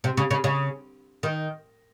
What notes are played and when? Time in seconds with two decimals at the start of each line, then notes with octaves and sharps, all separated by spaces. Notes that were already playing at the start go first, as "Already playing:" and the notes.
0.04 C3
0.17 C#3
0.31 C#3
0.44 C#3
1.23 D#3